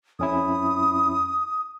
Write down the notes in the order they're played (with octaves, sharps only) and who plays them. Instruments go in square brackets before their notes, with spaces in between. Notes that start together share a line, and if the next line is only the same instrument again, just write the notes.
[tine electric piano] F2 C#4 E4 [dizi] D#6